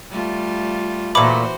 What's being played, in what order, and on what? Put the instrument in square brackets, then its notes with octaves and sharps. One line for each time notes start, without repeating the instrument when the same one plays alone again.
[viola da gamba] G3 A3 F4
[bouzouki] A#2 A3 [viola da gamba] E3 F#4 C5 [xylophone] B5 D6